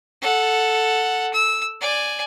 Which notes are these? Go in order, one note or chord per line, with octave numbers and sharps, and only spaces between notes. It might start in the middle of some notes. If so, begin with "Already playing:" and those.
A4 F#5
E6
D5 G#5